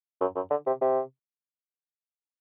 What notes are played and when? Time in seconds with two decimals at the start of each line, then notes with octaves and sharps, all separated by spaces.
0.21 F#2
0.35 F#2
0.50 D3
0.67 C3
0.81 C3